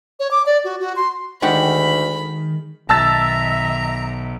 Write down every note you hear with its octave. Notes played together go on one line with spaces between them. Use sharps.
C#5
D6
D5
F#4
F#4
C6
D2 D#3 G#3 F#4 G4 B5
B1 D#3 E5 A5 A#5 E6 A6